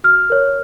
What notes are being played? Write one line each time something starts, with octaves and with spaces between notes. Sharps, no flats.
F#4 F6
A#4 C#5